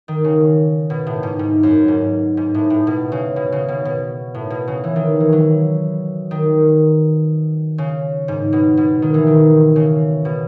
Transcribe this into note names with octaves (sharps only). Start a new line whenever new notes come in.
D#3
C#3
B2
A2
G#2
G#2
F#2
G#2
G#2
A2
A2
B2
C#3
B2
C#3
B2
B2
A2
B2
C#3
E3
D#3
E3
F#3
D#3
C#3
G#2
B2
B2
D#3
E3
D#3
C#3
B2